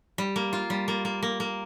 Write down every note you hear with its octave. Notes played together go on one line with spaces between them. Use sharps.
G3
A#3
F4
G3
A#3
A#3
A#3
A#3